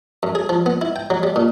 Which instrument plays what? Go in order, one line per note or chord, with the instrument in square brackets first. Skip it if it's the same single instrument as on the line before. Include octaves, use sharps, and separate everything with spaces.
[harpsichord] F#2
G#4
F3
B3
E4
G5
F#3
G3
A#2